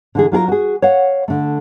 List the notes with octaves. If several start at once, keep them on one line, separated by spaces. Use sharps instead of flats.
D3 E3 G#4
F#3 F4 G#4 A#4
F#4 G#4
C#5 F5 F#5
D3 A3